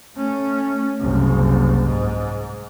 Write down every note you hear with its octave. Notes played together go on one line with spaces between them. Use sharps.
A3 C#4
F#1 C2
G#2